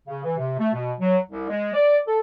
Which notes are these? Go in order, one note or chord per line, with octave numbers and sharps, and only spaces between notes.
C#3
E3
C3
A3
B2
F#3
C2
G#3
D5
A4